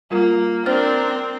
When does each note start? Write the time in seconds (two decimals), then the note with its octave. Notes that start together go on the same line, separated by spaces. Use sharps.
0.11 G3 A#3 F4 A#4
0.66 C4 D4 A#4 C5 F6 A6